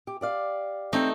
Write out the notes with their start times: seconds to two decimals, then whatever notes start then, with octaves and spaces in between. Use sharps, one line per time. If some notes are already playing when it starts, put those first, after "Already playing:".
0.07 G4
0.21 G4 D5 F5
0.93 A3 C4 D#4